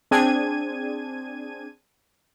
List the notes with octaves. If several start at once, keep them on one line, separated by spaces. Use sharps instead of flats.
C4 D4 G#4 G#6 D#7